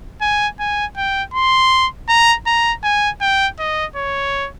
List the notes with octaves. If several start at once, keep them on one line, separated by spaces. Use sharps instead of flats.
G#5
G#5
G5
C6
A#5
A#5
G#5
G5
D#5
C#5